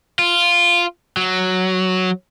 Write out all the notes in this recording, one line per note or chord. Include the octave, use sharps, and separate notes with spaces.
F4
F#3